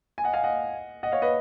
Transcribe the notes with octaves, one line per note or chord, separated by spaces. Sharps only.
G#5
D#5 F#5
F5 G#5
D#5 F#5
D#5 F#5
C#5 F5
B4 D#5